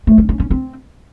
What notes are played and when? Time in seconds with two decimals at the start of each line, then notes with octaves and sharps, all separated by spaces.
0.07 A3
0.18 C#4
0.29 C#4
0.40 C#4
0.51 C4